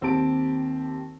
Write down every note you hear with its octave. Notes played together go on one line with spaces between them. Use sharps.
D#2 C4 G4 A5 D7